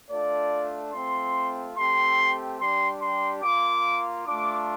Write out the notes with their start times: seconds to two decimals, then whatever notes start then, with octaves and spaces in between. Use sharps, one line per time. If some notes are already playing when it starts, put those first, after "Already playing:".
0.11 A3 D4 F4 D5
0.93 A3 C4 F4 C6
1.76 A3 C4 G4 C6
2.60 G3 D4 G4 C6
3.02 C6
3.43 A#3 F4 D6
4.26 A3 D4 F4 D6